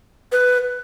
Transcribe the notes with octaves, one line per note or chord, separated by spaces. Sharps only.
B4